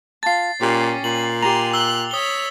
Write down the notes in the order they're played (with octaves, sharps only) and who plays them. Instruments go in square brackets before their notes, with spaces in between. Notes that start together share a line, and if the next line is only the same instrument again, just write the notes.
[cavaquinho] F4 A5 [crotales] A6 C7
[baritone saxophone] A#2 [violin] C#4 [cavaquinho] G4
[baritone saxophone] A#2 [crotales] F#7
[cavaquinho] G4 A#5 [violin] G#5 C6 [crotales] F7
[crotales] E6 G7 [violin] F#6
[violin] C#5 B6 [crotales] D#6 G7